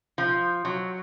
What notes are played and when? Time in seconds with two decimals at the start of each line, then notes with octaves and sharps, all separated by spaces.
0.18 F3
0.65 F#3